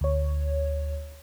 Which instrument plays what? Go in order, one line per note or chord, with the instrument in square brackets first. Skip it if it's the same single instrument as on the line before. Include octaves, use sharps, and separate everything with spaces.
[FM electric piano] D2 C#5